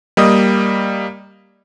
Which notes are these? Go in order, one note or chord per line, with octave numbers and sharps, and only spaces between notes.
G3 A#3 D#5 D#6